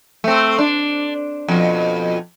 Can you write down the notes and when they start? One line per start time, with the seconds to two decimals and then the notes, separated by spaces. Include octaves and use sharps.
0.24 A3 C4
0.58 D4
1.48 F2 B2